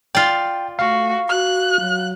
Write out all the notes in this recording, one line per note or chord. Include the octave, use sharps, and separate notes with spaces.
F4 D5 G5
A3 F#4 F5
F#4 F#6
F#3